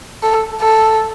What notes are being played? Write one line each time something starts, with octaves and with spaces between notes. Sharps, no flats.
A4
A4